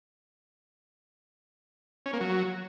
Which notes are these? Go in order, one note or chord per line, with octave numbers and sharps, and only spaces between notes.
C#4
A#3
F#3